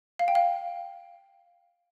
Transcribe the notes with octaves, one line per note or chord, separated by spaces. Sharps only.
F5
G5
F5